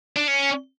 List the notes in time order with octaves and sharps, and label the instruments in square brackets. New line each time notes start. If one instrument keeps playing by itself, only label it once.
[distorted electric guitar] D4
C#4